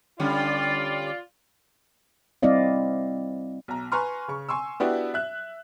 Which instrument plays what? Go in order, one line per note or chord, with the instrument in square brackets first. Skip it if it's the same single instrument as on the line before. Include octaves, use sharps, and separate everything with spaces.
[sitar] D3 G3 C#4 [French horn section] F4 D5
[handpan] G3 C4 E4 D5 D#5 F5
[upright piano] B1 A#5
B4 G#5 A#5 C6 C#6 F6
C#3 C#6
G#5 C6 C#6 E6
B3 D4 E4 F#4 G4
E5 F#6